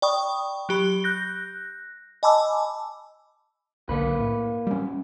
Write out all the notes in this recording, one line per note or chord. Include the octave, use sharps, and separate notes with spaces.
D5 G5 B5 C#6 D#6
F#3 G4 B5
F#6 G6 A#6
D#5 G#5 A5 B5 D6 E6
B1 D3 A#3 B4
A2
G3 C#4